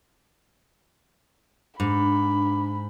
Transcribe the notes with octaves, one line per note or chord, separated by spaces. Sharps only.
G#2 D4 B5